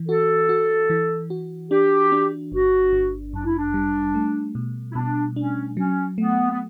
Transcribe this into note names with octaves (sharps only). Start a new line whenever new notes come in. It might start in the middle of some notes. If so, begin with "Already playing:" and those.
Already playing: E3
F#4 A4
F#4
E3
F#4
D4 G4
D4
G1 F#4
G1
F#2 D4
E4
D4
G3
A3
B2
E4
B2 D4
C#4 D4
F#3 C#4
A3 B3
B3